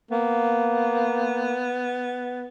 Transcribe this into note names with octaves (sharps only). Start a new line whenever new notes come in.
A#3 B3